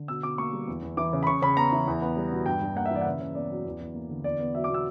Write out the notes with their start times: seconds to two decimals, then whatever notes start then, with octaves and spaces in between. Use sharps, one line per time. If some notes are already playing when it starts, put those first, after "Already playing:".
Already playing: D3
0.08 B2 E6
0.23 B2 D6
0.38 A#3 C#6
0.53 G3
0.68 E2
0.82 E2
0.97 E3 D6
1.13 C#3
1.23 B5
1.27 C#3 C#6
1.42 C#3 B5
1.57 B3 A#5
1.72 E3
1.87 E2
2.02 B3
2.17 G3
2.32 B2
2.46 G2 G5
2.61 G2
2.76 A#3 F#5
2.86 E5
2.91 E3 D5
3.01 F#5
3.06 C#3 E5
3.21 C#3
3.35 B3 D5
3.51 F#3
3.65 E2
3.80 E2
3.94 A#3
4.10 D3
4.24 E2 D5
4.40 B3
4.55 F#3 E5
4.64 D6
4.69 B2
4.74 E6